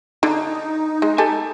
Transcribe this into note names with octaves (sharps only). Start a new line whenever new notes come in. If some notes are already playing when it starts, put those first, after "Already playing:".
D3 D#4
G#3
G4 A4 G#5